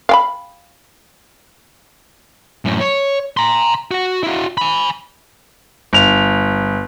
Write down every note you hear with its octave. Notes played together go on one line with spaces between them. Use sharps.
F5 G5 B5
F#2 A2
C#5
A#5 C6
F#4 F#5
E4 F#4
G#5 B5
G1 F7